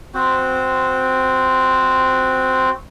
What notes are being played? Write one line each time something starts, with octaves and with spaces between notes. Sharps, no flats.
C4 F#4 C5